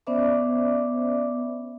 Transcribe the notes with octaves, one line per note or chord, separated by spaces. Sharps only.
B3 C#4 C5 D5 E5 D6